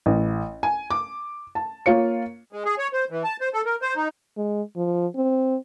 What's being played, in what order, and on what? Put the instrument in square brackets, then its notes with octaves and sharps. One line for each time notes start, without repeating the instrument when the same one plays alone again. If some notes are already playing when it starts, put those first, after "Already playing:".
[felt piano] A1
G#5
D6
A5
A#3 F4 C#5 C#7
[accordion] G#3
G#4
C#5
C5
E3
A5
C5
A4
A#4
C5
D#4
[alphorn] G#3
F3
C4